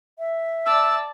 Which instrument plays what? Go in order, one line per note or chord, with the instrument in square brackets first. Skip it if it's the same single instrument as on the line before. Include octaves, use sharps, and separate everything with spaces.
[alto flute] E5
[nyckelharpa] D5 A5 [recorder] E6